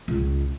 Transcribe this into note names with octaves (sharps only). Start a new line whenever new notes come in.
C#2